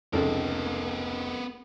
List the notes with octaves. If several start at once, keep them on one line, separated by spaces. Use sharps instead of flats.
F1 C#2 B3 A4 A#4